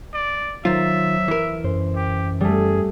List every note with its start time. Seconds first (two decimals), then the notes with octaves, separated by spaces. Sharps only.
0.14 D5
0.65 D#3 F#3 F4 C5 E5 A6
1.28 E3 A#4
1.64 F#2 C5
1.96 G4
2.41 G3 A3 G#4